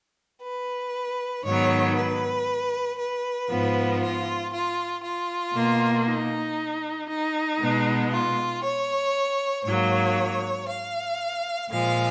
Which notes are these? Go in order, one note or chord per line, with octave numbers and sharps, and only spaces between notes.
B4
G#2 D#3 F#3 B3 C#5
B4
B4
G#2 F3 B3
F4
F4
F4
B2 A#3
D#4
D#4
B2 G#3 B3
F4
C#5
G#2 F#3 A#3 C#5
F5
A#2 F3 G#3 F5